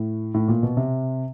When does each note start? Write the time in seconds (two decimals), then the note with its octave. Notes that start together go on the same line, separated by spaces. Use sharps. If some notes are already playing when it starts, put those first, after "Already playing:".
Already playing: A2
0.34 A2
0.48 A#2
0.63 B2
0.77 C3